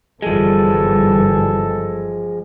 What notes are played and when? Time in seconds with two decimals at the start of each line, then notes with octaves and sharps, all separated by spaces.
0.22 G1 E3 F3 G3 G#3 A4